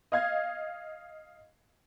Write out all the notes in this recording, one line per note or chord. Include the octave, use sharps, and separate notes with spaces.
D#5 F5 G#6